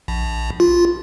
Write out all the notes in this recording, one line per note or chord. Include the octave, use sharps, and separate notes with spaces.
A#1
F4